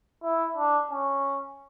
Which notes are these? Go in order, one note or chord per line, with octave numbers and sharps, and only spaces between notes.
E4
D4
C#4